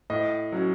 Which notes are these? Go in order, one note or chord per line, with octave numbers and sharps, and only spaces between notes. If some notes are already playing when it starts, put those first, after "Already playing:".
A2 D#5
F#3 C#4